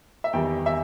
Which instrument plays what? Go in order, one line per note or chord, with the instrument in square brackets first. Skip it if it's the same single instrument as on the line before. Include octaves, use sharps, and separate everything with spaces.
[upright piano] E5
E2 D#3 G3 G5
E5